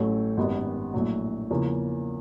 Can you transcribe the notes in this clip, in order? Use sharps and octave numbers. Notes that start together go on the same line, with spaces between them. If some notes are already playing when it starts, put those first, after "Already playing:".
Already playing: A1 A2 F#3 A3 C#4
G#1 F#2 D#3 G3 B3
A#1 A2 F#3
E2 C#3 F3 A#3 C#4